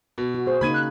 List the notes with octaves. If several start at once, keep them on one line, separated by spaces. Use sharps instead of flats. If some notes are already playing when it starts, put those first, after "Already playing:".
B2
F#4
G#4 C5
C#3 A#3 D#4 B5 G#6 D#7
F#6